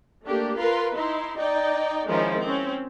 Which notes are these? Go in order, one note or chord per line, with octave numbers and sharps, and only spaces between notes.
A3 A#3 D4 G4
F4 A#4 B4 C6
D#4 E4 C6
D#4 D5 D#5 G5
D#3 F3 G#3 C#4 D#4 E4
C4 C#4